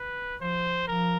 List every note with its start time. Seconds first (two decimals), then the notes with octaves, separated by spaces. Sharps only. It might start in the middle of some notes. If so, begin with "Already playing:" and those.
Already playing: B4
0.40 F3 C5
0.87 F3 A#4